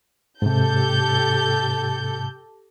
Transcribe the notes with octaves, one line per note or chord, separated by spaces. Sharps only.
G#2 C3 G4 A4 G6